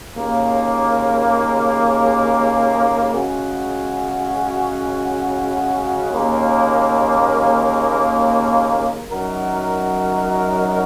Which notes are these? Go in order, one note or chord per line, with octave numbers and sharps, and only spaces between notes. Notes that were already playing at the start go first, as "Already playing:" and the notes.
D#2 C#3 A#3
C#3 G#3 C#4 F#4
D#2 C#3 A#3
F#2 F#3 D#4 F#4 A#4